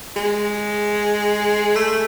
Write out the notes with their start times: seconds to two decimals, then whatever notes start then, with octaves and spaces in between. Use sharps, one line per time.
0.16 G#3
1.76 A3